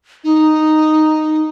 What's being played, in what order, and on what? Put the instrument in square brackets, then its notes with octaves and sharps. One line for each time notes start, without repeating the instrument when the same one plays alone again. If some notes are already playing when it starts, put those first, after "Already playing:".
[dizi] D#4